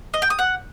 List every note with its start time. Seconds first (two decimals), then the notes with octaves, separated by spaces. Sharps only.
0.14 D#5
0.22 G5
0.30 D#6
0.39 F#5